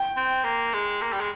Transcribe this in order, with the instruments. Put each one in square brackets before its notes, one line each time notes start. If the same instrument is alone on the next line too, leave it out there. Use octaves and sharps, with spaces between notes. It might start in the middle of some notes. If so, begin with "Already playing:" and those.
Already playing: [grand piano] G5
[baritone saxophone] C4
A#3
G#3
A#3
G3
G#3